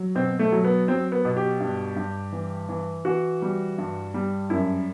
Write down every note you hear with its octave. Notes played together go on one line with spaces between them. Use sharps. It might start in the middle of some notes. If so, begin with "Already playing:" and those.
Already playing: F#3
B2 C4
A3
F#3
B3
F#3 C4
B3
B2
G4
G2
G2
E3
E3
E3 F#4
G3
G2
G3
F#2 E4